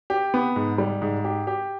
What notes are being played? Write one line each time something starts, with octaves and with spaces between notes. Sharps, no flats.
G4
B3
G#2
G3
G#2
G4
G4